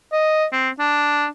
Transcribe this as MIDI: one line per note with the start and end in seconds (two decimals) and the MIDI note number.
0.12 0.45 75
0.53 0.70 60
0.79 1.26 62